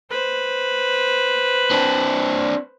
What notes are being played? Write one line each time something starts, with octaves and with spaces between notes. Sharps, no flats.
B4 C5
C4 D4